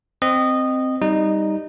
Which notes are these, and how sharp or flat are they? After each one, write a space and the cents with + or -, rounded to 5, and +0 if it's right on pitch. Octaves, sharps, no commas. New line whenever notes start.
C4 -5 D#5 -15
G3 +0 D#4 +0 D#5 -20